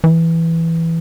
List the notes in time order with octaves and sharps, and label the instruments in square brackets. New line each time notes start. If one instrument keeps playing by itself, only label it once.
[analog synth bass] E3